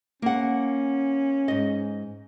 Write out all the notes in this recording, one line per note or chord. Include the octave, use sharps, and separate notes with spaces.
A#3 C#4 F#5
G#2 D#5